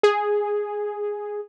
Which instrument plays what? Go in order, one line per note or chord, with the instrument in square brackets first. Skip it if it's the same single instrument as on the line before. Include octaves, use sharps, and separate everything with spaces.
[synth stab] G#4